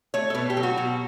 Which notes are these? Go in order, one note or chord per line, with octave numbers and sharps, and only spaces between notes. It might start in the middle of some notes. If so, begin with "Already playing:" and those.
A3 C#5
A4
B2 B4
G4
F#3
F#4
B2